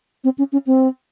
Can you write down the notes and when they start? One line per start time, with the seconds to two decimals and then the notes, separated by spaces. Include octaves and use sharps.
0.24 C4
0.38 C#4
0.52 C#4
0.67 C4